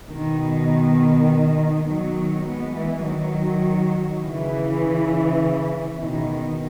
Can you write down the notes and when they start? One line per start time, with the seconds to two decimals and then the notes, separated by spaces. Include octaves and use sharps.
0.11 B2 D#3
1.88 D#3 F#3
2.46 G#3 B3
2.76 E3 G#3
3.05 D#3 F#3
4.23 C#3 E3
6.00 B2 D#3